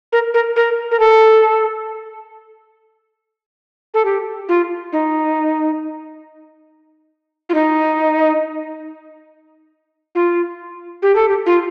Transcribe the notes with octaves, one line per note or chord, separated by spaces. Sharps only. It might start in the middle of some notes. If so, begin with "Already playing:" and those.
A#4
A#4
A#4
A#4
A4
A4
G4
F4
D#4
F4
D#4
F4
G4
A4
G4
F4